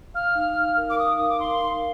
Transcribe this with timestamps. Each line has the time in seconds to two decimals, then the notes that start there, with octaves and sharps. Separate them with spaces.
0.14 F5 F6
0.35 D#4
0.56 D#4
0.77 A#4
0.90 D6
0.98 F5 D#6
1.17 D#4 D#6
1.29 D6
1.40 D#4 C6
1.60 D#4